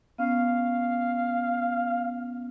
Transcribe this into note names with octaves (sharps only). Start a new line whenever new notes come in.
B3 C#4 F5